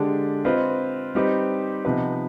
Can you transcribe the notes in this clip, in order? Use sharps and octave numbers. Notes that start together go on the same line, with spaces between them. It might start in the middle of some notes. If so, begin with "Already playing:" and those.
Already playing: D3 G#3 D4 G4
C4 F4 B4 D#5
G3 C4 D#4 G4 B4
C3 F3 B3 D#4 B4